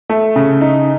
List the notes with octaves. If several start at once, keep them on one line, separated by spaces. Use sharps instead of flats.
A3
C#3
D#4